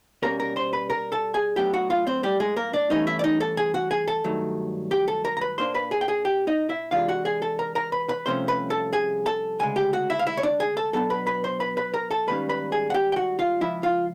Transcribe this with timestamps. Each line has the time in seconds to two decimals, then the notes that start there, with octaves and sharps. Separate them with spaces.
0.22 B2 G3 A#3 C#4 A#4 A#5
0.40 A#4 A#5
0.56 C5 C6
0.73 B4 B5
0.90 A#4 A#5
1.12 A4 A5
1.34 G#4 G#5
1.56 A2 F#3 B3 D4 G4 G5
1.74 F#4 F#5
1.90 F4 F5
2.07 C4 C5
2.23 G3 G4
2.40 G#3 G#4
2.56 A#3 A#4
2.73 D4 D5
2.90 G2 E3 A3 C#4 D#4 D#5
3.07 E4 E5
3.19 D5
3.24 D#4 D#5
3.40 A4 A5
3.57 G#4 G#5
3.74 F#4 F#5
3.91 G#4 G#5
4.08 A4 A5
4.24 G2 D#3 F#3 A3
4.91 G4 G5
5.08 A4 A5
5.25 A#4 A#5
5.37 A#5
5.41 B4 B5
5.58 A#2 F#3 A#3 D4 C5 C6
5.74 B4 B5
5.91 G#4 G#5
6.01 G5
6.08 G#4 G#5
6.25 G4 G5
6.47 D#4 D#5
6.69 E4 E5
6.91 C3 E3 G#3 D4 F4 F5
7.08 F#4 F#5
7.25 G#4 G#5
7.42 A4 A5
7.59 A#4 A#5
7.75 A#4 A#5
7.92 B4 B5
8.09 B4 B5
8.26 C2 C3 F3 A3 C#4 C5 C6
8.48 B4 B5
8.70 A4 A5
8.93 G#4 G#5
9.26 A4 A5
9.59 D2 C#3 G#3 G#5
9.76 G4 G5
9.93 F#4 F#5
10.10 E4 E5
10.19 F5
10.27 E4 E5
10.37 C#5
10.43 D4 D5
10.60 G#4 G#5
10.77 A4 A5
10.93 B2 F#3 B3 D4 A4 A5
11.10 B4 B5
11.27 B4 B5
11.44 C5 C6
11.60 B4 B5
11.77 B4 B5
11.94 A#4 A#5
12.11 A4 A5
12.27 G#2 D#3 G3 A#3 C#4 B4 B5
12.49 B4 B5
12.72 G#4 G#5
12.90 F#5
12.94 G4 G5
13.12 G5
13.16 F#4 F#5
13.39 F4 F5
13.61 C#2 C#3 F3 E4 E5
13.83 F4 F5